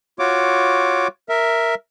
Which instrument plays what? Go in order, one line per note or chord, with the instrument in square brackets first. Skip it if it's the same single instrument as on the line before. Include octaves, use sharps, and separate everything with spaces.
[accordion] F4 F#4 C#5 D6
A#4 E5